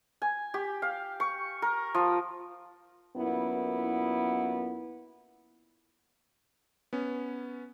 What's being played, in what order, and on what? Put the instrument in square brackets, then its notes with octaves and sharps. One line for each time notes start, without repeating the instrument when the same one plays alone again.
[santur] G#5
G4
F5
C#6
A#4
F3
[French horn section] F#2 A#2 B3 E4
[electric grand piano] B3 C#4